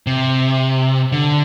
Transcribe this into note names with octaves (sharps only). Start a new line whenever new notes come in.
C3
D3